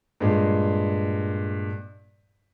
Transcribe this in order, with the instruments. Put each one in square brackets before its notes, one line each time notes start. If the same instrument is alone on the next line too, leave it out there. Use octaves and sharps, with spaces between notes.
[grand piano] G2 A#2 G#3